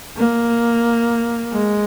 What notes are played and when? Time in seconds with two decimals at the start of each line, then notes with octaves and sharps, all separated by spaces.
0.17 A#3
1.52 G#3